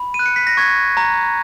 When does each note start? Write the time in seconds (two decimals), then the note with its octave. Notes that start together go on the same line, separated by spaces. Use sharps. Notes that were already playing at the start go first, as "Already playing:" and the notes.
Already playing: B5
0.14 D#7
0.19 F#6
0.26 C#7
0.36 B6
0.47 A#6
0.57 C#6 G#6
0.97 A#5